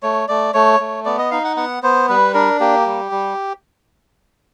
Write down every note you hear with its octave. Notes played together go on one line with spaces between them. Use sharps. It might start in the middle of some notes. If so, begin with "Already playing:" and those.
A3 C#5
A3 D5
A3 C#5
A3
B3 D5
D#5
D#4 F5
F#5
B3 F#5
B3 C5
G3 B4
D4 A#4
A#3 G4
G3
G3